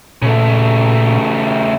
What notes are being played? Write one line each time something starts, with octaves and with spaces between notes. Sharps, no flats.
A#2 C#3 A3